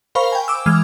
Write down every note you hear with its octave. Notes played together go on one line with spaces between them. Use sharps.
A#4 C5 F5 B5 C#6
G5 G#5
D6 E6
E3 G#3 F6